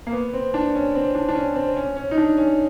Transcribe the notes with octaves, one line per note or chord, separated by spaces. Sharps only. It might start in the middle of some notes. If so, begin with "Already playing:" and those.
A#3
B3
C4
D4
C#4
C4
D4
D4
C#4
C4
C#4
C#4
D#4
D4
C#4